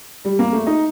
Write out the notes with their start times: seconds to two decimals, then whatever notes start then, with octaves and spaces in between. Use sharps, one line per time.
0.25 G3
0.39 A#3
0.53 A3
0.67 D#4